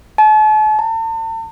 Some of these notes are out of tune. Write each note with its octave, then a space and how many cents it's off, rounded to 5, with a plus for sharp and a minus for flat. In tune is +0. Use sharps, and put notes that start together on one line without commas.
A5 -40
A5 +40